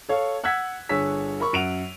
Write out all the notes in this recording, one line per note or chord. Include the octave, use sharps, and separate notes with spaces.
A4 C#5 F5
F#5 E6 F#6 G#6 B6
G1 D3 G#4 C#5 E6 B6
A#4 B5 C#6
F#2 F#5 D7 D#7 F7